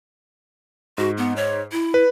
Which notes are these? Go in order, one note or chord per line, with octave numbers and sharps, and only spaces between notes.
G#2 F#4
B3
C#5
E4
B4